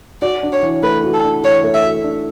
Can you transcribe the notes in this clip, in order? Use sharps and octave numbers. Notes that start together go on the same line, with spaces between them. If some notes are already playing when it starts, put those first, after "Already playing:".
F#4 D5
D4
C#5
E3
A3 B4
F#4
A4
D4
E3 C#5
A3
E5
F#4
D4